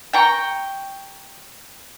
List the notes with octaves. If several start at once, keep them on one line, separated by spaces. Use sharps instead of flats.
G5 A#5 C#6